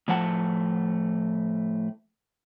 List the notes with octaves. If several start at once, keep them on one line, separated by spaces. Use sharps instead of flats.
A2 F3 A3 F#5 A5